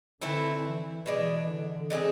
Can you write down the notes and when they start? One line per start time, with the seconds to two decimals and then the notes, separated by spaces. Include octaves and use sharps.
0.21 D3 E3 A3 C4 E4
0.64 E3
1.06 B2 E3 G#3 D4
1.48 D3
1.90 D3 G#3 C4 G#4